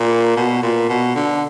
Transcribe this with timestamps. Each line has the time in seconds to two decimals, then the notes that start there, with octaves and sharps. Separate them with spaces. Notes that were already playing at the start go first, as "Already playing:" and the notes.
Already playing: A#2
0.37 B2
0.63 A#2
0.89 B2
1.15 D3